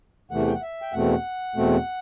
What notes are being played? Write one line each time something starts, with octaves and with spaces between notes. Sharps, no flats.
E2 C3 E3 A3 F#5
G5
F#5
E5
G5
E2 B2 A3 C4 F#5
E2 B2 A3 C4